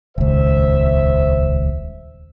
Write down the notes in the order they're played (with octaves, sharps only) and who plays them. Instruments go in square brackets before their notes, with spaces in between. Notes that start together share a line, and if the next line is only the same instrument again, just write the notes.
[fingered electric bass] D#1 C#2 [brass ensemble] C5 E5